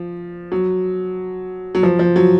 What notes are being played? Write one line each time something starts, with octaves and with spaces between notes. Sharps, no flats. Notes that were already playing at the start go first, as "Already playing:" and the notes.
Already playing: F3
F#3
F#3
F3
F3
F#3